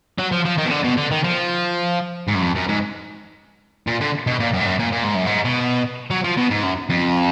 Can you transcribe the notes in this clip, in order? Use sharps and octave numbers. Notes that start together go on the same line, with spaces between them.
F#3
F3
F3
D#3
B2
D3
B2
D3
D#3
F3
G#2
F#2
F2
F#2
G#2
A#2
D3
B2
A#2
F#2
G#2
F#2
A#2
A#2
G#2
F#2
G#2
B2
F#3
F3
B2
G#2
F#2
F2